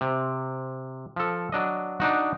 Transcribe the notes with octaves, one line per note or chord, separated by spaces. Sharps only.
C3
F3 A4
F#3 D4 D#5
D4 D#4 F#4